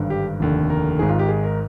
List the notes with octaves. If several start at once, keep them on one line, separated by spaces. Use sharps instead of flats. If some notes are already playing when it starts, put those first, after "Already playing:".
Already playing: G#1 G2 D3
G4
F1 D#2 D3
A#4
G#1 G#2 D#3 G#4
F4
G4
G#4
A#4